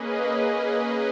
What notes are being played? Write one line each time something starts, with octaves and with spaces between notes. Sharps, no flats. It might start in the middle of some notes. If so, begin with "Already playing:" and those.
Already playing: A#3 C#4 G#4 B4 D#5